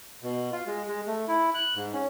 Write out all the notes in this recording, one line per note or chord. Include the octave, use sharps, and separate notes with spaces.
B2
F4
G#3
G#3
A3
E4
F#6
G#2
C#4